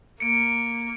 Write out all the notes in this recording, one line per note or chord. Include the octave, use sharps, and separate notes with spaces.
A#3 C#7 D7